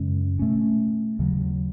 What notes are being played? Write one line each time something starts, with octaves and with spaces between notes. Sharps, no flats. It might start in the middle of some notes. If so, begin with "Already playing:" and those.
Already playing: F#2 C#3 G#3 C#4
B2 A3 C#4
D#2 C#3 F#3